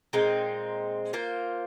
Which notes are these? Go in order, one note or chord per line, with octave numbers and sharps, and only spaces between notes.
A#2 G#3 C4 D#4
A#3 F4 C5